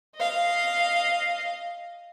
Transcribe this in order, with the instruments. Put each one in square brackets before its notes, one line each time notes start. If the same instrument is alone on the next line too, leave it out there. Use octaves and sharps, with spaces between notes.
[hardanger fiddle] D#5 F5